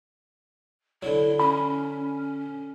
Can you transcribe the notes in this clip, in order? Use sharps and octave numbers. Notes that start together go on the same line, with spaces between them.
D3 F#3 E4
C#4 B5